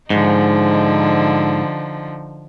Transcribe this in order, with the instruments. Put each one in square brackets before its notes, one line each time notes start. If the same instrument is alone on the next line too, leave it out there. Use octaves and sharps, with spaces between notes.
[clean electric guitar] G#2 [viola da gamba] D3 F3 D#4